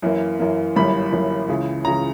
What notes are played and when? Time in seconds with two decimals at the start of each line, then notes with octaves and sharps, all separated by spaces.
0.02 F#2 E3 A#3
0.40 F#2 E3 A#3
0.76 G1 F#2 E3 G3 A#3 B5
1.12 G1 F#2 E3 G3 A#3
1.48 C#2 C#3 E3
1.85 C#2 C#3 E3 A#5